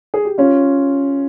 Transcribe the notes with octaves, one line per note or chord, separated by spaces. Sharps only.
G#4
G4
C#4 F4